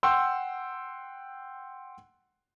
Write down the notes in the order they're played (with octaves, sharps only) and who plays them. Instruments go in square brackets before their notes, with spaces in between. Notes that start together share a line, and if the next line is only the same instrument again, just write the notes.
[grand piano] F#5 G5 C6 E6